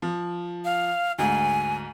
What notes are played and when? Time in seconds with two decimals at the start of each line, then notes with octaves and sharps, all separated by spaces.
0.02 F3
0.65 F5
1.18 D2 G#2 G#5